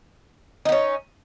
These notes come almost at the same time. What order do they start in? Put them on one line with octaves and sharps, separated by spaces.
D#4 B3 C#4